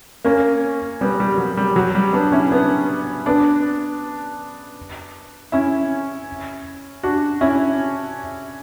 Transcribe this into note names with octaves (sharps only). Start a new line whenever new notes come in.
A#3 C#4
G3 B3
G3
F#3
G3
F#3
G3
B3 D4
C#4 E4
B3 D4
B3 D4
C#4 E4
D4 F#4
C#4 E4